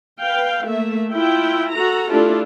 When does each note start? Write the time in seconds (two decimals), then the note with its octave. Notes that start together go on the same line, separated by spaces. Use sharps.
0.21 B4 F5 G5
0.65 A3 A#3 E5
1.13 E4 F4 E5 G5
1.71 F#4 A4 A#5
2.10 A3 D4 E4 F4 G4 A4